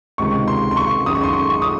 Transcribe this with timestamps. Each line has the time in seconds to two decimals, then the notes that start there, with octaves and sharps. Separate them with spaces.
0.18 C#2 C3 D#3 G#3 C#6
0.48 C6
0.71 C6
0.77 C#6
1.06 F#2 D#3 G#3 D#6
1.15 C#6
1.23 C6
1.33 C#6
1.50 C#6
1.62 D#6